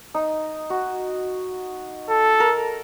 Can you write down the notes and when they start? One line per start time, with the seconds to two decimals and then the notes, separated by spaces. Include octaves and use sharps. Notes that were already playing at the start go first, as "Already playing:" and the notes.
0.14 D#4
0.70 F#4
2.10 A4
2.40 A#4